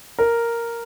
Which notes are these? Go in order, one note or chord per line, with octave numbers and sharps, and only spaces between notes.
A#4